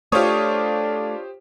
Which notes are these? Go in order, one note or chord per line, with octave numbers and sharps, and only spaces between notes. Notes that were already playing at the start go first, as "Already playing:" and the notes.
A3 D4 F4 G4 C5 C#5 D#6